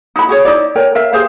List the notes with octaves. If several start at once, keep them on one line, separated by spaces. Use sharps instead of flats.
D#4 E4 F#4 B5
F#4 G#4 C#5
D#4 E4 D5
A#4 C#5 G5
A#4 E5 F5
G4 G#4 C5 F5